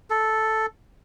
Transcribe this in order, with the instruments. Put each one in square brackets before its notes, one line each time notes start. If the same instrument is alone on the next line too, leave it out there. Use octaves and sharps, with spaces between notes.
[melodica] A4